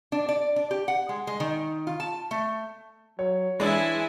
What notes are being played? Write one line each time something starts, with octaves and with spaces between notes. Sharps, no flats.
D4
D5
D4
G4
F#5
G#3
G#3
D#3
F4
A5
A3
F#3 C#5
E3 G#3 D4 E4 G#5